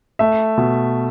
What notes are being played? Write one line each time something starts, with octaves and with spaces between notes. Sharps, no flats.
A3 E5
B2